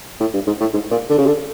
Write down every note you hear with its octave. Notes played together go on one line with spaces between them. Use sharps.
A2
G2
G#2
A2
G#2
A#2
D3
C#3
D3